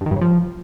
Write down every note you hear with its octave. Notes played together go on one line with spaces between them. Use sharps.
G2
D#3
G2
C#3
F3